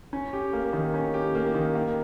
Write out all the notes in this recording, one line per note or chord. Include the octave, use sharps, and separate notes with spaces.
C#4
G4
A#3
D#3
C#4
G4
A#3
D#3
A#3